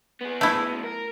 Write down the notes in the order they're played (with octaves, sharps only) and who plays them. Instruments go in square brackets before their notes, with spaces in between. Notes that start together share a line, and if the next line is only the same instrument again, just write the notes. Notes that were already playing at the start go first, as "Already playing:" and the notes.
[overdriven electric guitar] B3 G#4
[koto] A3 E4
[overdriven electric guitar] F#2 B2
A#4